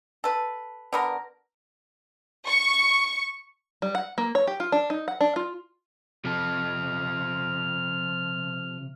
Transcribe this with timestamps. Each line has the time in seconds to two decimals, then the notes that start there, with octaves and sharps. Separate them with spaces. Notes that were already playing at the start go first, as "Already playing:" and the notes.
0.24 A4 B4
0.93 D3 B3 A#4
2.48 C#6
3.82 G3
3.95 F#5
4.18 A#3
4.35 C#5
4.47 G4
4.60 F4
4.72 D4
4.90 D#4
5.08 F#5
5.21 D4
5.36 F4
6.25 C3 F3 A4 F6